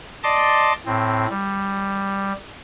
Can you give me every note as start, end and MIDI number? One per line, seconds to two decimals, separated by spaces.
0.23 0.73 74
0.23 0.73 75
0.23 0.73 81
0.23 0.73 84
0.23 0.73 86
0.86 1.27 45
0.86 1.27 60
1.30 2.33 55